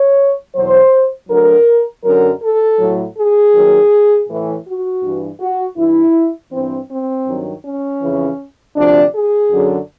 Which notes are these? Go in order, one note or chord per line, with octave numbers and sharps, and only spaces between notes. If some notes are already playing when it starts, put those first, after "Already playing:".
Already playing: C#5
E2 B2 F#3 C5
D2 D3 F#3 A#4
F#2 D3 F#3 A#4
A4
A2 F#3
G#4
D#2 D#3 F#3
A2 E3
F#4
G2 E3
F#4
G2 E3 E4
G2 E3 C4
C4
G2 D#3 F#3
C#4
F2 C#3 E3
D2 C3 F3 D4
G#4
F#2 D3 F#3